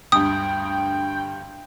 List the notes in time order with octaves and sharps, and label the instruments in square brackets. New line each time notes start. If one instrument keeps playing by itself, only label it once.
[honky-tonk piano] D2 G2 [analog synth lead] G5 [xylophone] D#6